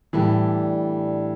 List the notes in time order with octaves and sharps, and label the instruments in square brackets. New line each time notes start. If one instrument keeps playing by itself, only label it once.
[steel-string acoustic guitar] A2 G3 D4 [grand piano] E3